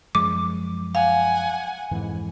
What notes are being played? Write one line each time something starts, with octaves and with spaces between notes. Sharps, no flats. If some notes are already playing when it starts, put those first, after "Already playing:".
F#2 F3 G#3 D6
F5 F#5 G#5
F2 G#2 E3